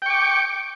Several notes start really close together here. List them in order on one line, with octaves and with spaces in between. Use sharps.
G5 C#6 D6